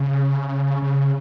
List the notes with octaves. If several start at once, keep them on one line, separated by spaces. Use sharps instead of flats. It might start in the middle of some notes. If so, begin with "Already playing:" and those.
Already playing: C#3
C#3